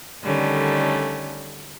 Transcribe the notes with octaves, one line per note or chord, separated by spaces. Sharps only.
D3 D#3 G3 A3 C#4